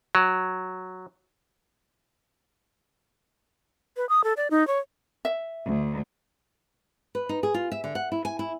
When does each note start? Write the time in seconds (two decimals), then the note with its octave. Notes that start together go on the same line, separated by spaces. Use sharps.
0.15 F#3
3.97 B4
4.09 D#6
4.24 A4
4.37 D5
4.51 D#4
4.67 C#5
5.25 E5
5.65 D2
7.15 B4
7.29 D#4
7.43 G#4
7.54 F4
7.72 E5
7.84 D3
7.95 F#5
8.12 E4
8.25 G#5
8.39 E4